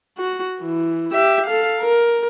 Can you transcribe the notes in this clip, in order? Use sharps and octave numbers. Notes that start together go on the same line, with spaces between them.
F#4
E3
G4 E5
A4 F5
A#4